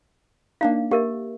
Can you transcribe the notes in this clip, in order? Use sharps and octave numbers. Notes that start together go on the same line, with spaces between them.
A#3 D4 D#4 F5
A#3 G4 A#4 E5